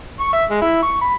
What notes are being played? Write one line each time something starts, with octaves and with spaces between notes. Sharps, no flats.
C#6
E5
G#3
E4
C#6
B5